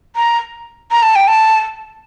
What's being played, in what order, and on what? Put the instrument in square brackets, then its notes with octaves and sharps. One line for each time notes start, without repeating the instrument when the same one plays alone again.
[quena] A#5
A#5
A5
G5
A5